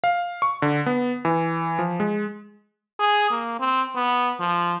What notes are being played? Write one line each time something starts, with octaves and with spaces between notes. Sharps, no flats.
F5
C#6
D3
B3
E3
F3
G#3
G#4
A#3
C4
B3
F3